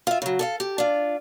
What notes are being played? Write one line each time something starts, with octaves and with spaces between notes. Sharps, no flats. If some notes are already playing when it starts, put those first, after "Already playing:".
F4 E5
C#3 F#3
A4 D5 F5
G4
D4 F4